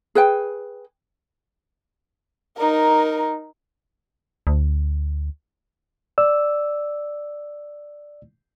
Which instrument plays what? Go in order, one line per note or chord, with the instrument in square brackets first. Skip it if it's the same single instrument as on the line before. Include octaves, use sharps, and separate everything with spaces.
[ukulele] G#4 B4 G5
[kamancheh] D#4 A#4
[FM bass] D2
[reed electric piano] D5 E6